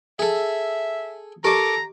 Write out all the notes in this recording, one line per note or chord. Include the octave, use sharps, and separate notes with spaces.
G#4 A4 E5
G4 A4 A#4 D#5 A#5 D6